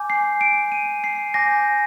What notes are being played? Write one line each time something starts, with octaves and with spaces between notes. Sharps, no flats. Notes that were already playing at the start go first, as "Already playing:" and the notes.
Already playing: G#5 D6 G6
C7
D7
D#7
C7
G#5 D6 G6 A#6